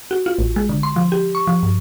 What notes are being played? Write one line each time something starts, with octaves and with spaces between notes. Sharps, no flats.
F#4
F4
A1
G#3
D3
C6
F3
G4
C#6
F3
G2